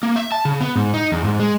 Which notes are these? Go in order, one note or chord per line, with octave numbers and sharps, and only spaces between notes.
A#3
E5
A5
C#3
B3
G#2
D#4
E2
G#2
G#3